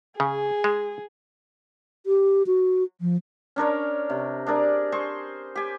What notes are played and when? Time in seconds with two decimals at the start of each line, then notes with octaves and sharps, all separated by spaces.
0.20 C#3 G#4
0.64 G#3
2.06 G4
2.47 F#4
3.01 F3
3.56 C#4 D4 A#4 C#5
4.10 C3
4.47 D4 G#4 A#4 D5
4.92 G#4 C5 C#6
5.56 G4 G#5